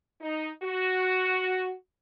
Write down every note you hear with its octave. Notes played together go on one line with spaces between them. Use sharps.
D#4
F#4